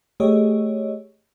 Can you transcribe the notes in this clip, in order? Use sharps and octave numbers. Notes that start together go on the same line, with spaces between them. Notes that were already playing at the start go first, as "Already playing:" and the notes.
A3 G4 G#4 C#5 D#5